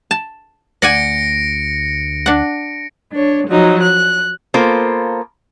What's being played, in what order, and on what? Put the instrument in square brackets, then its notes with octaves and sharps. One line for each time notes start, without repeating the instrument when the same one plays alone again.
[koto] A5
[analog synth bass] D2 [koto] D5 F#5 G#5 [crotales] A#6 C#7 D7
[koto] D4 F#5
[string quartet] D4 C#5
F3 F#3 D#4
F#6
[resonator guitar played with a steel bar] A#3 B3 F4 A4 C5